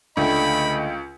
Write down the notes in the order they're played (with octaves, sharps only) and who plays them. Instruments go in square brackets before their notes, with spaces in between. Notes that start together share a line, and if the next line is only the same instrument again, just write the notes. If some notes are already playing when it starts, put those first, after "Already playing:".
[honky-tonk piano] C#2 [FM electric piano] D3 A3 [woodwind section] D#5 G5 [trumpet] B5